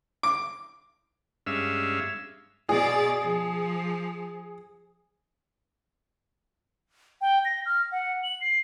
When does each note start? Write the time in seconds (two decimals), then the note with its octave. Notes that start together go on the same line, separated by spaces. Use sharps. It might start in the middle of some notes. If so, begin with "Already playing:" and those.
0.23 D6
1.47 G2 G#3 C#4 E5 F5 E6
2.69 B2 G#4 D5
3.21 F3
7.21 G5
7.45 A#6
7.66 F6
7.92 F#5
8.23 F#7
8.41 C7